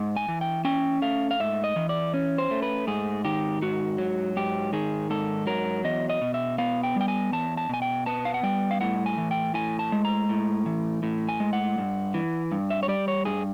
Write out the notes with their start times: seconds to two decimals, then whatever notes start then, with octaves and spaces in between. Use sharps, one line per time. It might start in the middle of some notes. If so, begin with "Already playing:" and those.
Already playing: G#2
0.16 G#5
0.28 E3
0.41 G5
0.65 C#4 G5
1.02 A3 F5
1.31 F5
1.40 G#2 E5
1.64 D#5
1.76 E3
1.89 D5
2.14 C#4
2.38 C5
2.51 A3
2.62 B4
2.87 G#2 G#4
3.25 D#3 G4
3.62 G#2 F#4
3.98 F#3
4.36 G#2 G4
4.73 D#3 G#4
5.10 G#2 A4
5.47 F#3 A#4
5.84 E2 D#5
6.10 D#5
6.21 B2
6.34 E5
6.58 B3 F5
6.83 G5
6.96 G3 G5
7.08 G#5
7.33 E2 A5
7.57 A5
7.69 B2 G#5
7.82 G5
8.06 B3 A5
8.25 F5
8.34 F#5
8.43 G3 G5
8.71 F5
8.81 A2 F#5
9.06 G#5
9.17 E3
9.31 G5
9.54 A2 G#5
9.79 A5
9.92 G#3
10.05 A#5
10.29 A2
10.66 E3
11.03 A2
11.29 G#5
11.40 G#3
11.53 F#5
11.78 G2
12.14 E3
12.52 G2
12.70 E5
12.83 C#5
12.88 G3 D5
13.08 C#5
13.25 G2 G#4